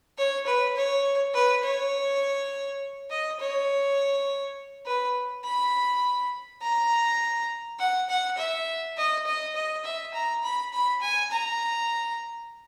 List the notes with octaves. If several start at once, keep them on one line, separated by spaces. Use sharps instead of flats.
C#5
B4
C#5
B4
C#5
D#5
C#5
B4
B5
A#5
F#5
F#5
E5
D#5
D#5
D#5
E5
A#5
B5
B5
G#5
A#5